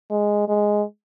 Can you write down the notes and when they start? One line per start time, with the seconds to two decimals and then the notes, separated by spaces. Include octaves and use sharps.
0.11 G#3
0.49 G#3